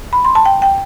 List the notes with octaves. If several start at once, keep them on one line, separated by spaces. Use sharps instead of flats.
B5
C6
A5
G5
G5